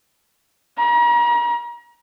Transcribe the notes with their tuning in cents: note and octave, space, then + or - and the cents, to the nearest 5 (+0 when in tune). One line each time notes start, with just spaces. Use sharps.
A#5 +40